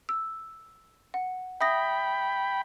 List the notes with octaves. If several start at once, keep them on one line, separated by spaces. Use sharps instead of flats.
E6
F#5
E5 G5 B5 D#6 A#6